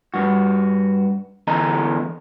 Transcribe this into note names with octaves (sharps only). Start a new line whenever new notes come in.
G2 F#4
E2 D3 D#5 A#5